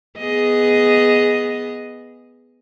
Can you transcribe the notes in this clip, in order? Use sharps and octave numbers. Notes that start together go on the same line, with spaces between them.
B3 G#4 D#5